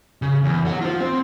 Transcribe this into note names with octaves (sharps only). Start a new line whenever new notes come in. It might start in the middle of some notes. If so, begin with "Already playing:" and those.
C#3
E2
C#5 F#5
F4 C5
C4